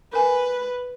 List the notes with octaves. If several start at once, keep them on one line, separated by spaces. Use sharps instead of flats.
A#4 B4 G#5